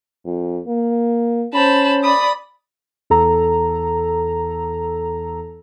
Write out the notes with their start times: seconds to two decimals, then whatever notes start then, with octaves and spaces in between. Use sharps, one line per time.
0.25 F2
0.67 A#3
1.53 C#4 C5 A5 B5
2.03 D5 B5 D#6
3.10 E2 A4 A#5